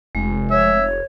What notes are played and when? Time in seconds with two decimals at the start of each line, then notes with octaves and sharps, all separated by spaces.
0.15 F1 G#3
0.51 C#5 E5